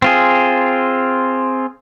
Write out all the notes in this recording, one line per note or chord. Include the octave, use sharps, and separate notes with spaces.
C4 F4 G#4